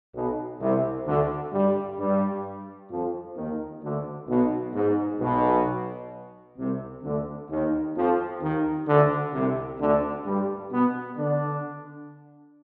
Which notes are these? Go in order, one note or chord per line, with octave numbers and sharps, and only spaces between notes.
B1 B2
C2 C3
D2 D3
G2 G3
G2 G3
F2 F3
D#2 D#3
D2 D3
B1 B2
G#2
B1 B2
C2 C3
D2 D3
D#2 D#3
F2 F3
D#2 D#3
D2 D3
C2 C3
D2 D3
G2 G3
B2 B3
D3 D4